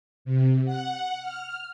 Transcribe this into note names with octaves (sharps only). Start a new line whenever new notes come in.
C3
F#5
F6